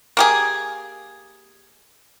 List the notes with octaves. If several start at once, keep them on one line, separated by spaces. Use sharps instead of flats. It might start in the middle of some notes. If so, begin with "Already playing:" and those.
A#3 G4 G#4